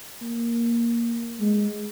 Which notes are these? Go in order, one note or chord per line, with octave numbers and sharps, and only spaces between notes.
A#3
G#3